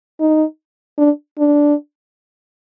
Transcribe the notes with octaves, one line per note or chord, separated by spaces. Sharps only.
D#4
D4
D4